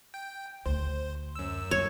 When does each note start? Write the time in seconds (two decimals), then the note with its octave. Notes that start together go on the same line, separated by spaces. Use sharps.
0.14 G5
0.66 D2 C5
1.35 F#2 E6
1.71 G3 C#5